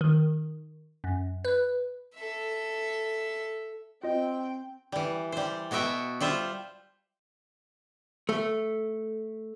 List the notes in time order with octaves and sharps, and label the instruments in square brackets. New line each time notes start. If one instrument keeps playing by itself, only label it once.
[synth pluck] D#3
F#2
B4
[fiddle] A4 E5
[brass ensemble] C4 [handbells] F4 D#5 [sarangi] G5
[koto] E3 G3
G3 C5
B2 B3 F#4 E5 G5
G3 F4 C5 E5
[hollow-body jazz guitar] A3